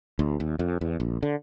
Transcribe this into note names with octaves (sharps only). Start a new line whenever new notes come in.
D2
D#2
F2
E2
A#1
D3